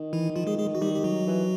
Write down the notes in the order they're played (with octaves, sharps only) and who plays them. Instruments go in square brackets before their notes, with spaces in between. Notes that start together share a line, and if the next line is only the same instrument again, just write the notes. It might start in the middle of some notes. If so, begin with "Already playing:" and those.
Already playing: [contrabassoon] D#3
[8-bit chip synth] E3 E4
F3 F4
G#3 G#4
G#3 G#4
F#4
[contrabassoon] D#3 [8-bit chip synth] G3 G4
[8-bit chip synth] G4
F#3 F#4
[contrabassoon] E3